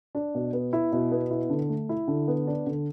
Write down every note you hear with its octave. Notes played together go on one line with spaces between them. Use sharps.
D4
B2
B3
E4
B2
B3
E4
D3
A3
E4
D3
B3
D4
D3